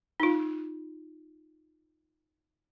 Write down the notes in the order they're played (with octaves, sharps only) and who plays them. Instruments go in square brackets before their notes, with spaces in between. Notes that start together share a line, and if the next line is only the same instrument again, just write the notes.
[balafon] D#4 F4